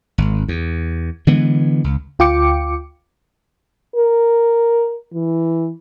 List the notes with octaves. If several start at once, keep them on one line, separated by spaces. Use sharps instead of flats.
G#1
E2
D3 E3 G#3 B3
C#2
D2 F4 G5 D6 C#7
A#4
E3